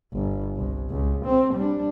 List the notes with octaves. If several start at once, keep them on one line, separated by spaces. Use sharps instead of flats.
G1
C2
C#2
C4
G3 D4